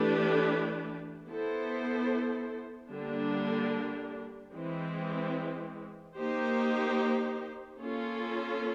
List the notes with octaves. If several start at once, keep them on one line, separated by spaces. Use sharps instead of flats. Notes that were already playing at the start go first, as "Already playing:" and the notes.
Already playing: E3 A3 D4 G4 B4
B3 E4 A4 C5
D3 G3 A#3 D4
E3 G#3 C4
A#3 D#4 G4 C5
A#3 C#4 F4 A4